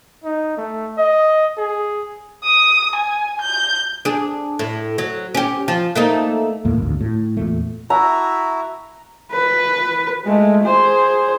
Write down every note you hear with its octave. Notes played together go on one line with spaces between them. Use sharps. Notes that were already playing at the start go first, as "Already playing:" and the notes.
D#4
A3
D#5
G#4
D#6
G#5
G6
D4 G#4
A2
F#3
C#4 G4
F3
A3 A#3 D#4
D#2 A2 A#3
G#1 D2
A2
E2 A#2 A3
E4 F#4 E5 A#5
B4
G#3 A3
G#4 C5